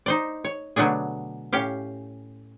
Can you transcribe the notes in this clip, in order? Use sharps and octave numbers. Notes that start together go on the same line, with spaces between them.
D#4 C5 D5
C#5
B2 D3 F#3 A3 D4 G#4
A2 C#4 G4 F5